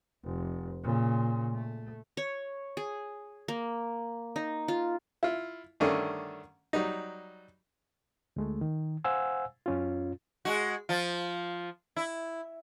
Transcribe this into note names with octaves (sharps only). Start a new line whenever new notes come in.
F1
A#2 C#3
A3
C#5
G#4
A#3
D#4
F4
E4 F4
G2 D3 D#3 A3 C#4 D4
F#3 G3 D#4
D2 G#3 A3
D#3
C5 F5 F#5 G#5 E6
F#2 C#4 F4
G#3 F#4
F3 F4
E4